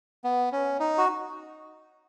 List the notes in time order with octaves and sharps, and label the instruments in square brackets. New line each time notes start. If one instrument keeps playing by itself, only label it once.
[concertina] B3
C#4
D#4
F#4